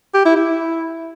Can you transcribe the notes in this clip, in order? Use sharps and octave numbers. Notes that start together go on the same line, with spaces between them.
G4
E4
E4